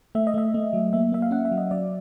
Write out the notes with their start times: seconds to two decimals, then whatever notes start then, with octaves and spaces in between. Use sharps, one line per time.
0.15 A3 E5
0.27 D#5
0.34 A3 E5
0.54 A3
0.73 F#3
0.93 A#3 E5
1.12 A#3 E5
1.22 F5
1.31 C#4 F#5
1.45 E5
1.52 F#3
1.58 D#5
1.71 F#3 D5